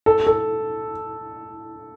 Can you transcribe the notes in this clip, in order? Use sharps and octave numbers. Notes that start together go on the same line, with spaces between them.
A4
A4